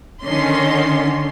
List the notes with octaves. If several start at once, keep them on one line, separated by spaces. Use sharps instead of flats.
D3 D#3 C#4 C6